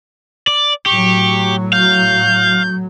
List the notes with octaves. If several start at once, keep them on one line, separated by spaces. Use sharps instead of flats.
D5
A2 F#3 G4 C#6
F5 G6